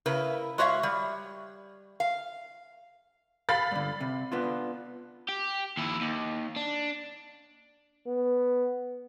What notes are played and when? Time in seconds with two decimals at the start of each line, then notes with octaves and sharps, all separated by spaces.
0.06 C#3 A#3 E4 B4
0.58 G#3 F#4 C#5 E5 F5
0.83 G3
2.00 F5
3.49 F5 B5 A6
3.71 G2 D3
4.01 C3
4.32 B3 D4 F4
5.29 G4
5.77 D#2 E4
6.01 D#2
6.56 D4
8.07 B3